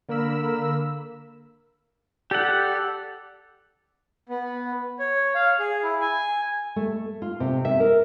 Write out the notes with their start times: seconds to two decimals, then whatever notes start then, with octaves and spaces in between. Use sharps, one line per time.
0.09 D3 A#3 A#4 B5 E6
2.31 G4 A4 D5 F#5
4.29 B3
4.99 C#5
5.35 F5
5.60 G#4
5.83 E4
6.01 G#5
6.76 A3
7.22 F4
7.40 C3
7.65 E5
7.80 A#4